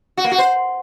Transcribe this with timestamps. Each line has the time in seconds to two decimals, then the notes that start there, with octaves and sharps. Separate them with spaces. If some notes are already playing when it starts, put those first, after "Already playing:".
0.17 F#4
0.24 A#3
0.31 F#4
0.38 C5